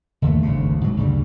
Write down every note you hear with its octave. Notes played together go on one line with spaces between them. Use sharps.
G1 D#2 D3 A3
G#1 D2 C#3
G#2 B2 F#3
D2 G2 C#3 G3